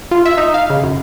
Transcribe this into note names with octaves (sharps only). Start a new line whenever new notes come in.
F4
E5
D#4
F5
C#3
F#2